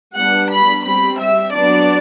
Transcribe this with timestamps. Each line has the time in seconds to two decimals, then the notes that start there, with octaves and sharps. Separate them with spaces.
0.14 G3 B3 D4 F#5
0.49 B5
0.84 G3 C4 B5
1.19 E5
1.54 F#3 B3 D4 D5